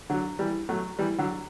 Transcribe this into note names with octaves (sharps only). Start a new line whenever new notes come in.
D3 F#3
E3 G3
F#3 A3
E3 G3
D3 F#3